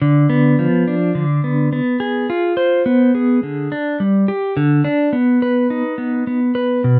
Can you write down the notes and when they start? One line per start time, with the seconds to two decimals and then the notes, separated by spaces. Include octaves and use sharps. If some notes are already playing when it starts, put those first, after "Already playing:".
0.02 D3
0.30 B3
0.59 F3
0.88 D4
1.15 D3
1.44 B3
1.73 B3
2.00 G#4
2.30 F4
2.57 C5
2.86 B3
3.15 G#4
3.43 D3
3.72 D4
4.00 G3
4.28 G4
4.57 D3
4.84 D4
5.13 B3
5.42 B4
5.70 D#4
5.98 B3
6.27 B3
6.55 B4
6.84 B2